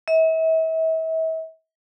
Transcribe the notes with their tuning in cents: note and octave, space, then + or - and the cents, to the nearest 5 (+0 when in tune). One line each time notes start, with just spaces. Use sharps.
E5 -40